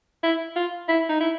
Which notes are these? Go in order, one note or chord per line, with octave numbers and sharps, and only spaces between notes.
E4
F4
E4
D#4
E4